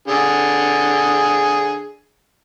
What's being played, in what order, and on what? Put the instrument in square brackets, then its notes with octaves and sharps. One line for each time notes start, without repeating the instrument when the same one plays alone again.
[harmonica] D3 G#4